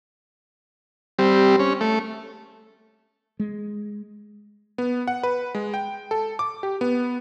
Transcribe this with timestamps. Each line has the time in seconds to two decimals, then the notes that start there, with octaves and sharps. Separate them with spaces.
1.19 G3 C4
1.60 C#4
1.81 A3
3.39 G#3
4.78 B3
5.07 F#5
5.23 B4
5.55 G#3
5.74 G5
6.11 A4
6.39 D6
6.63 G4
6.81 B3